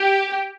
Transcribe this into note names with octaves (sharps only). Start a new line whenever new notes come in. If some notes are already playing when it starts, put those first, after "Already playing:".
Already playing: G4